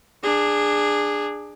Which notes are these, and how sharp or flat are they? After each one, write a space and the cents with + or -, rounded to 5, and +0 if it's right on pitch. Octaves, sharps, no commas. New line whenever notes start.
D4 +15 G#4 -10